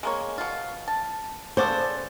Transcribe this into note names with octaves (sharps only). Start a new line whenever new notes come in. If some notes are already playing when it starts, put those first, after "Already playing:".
G#3 A#3 C#5
B2 F4
A5
C#3 B3 A4 C5 D5